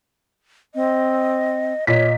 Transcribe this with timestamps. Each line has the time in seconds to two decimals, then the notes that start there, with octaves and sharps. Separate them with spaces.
0.75 C4 D#5
1.87 A#2 C#5 D#5 B6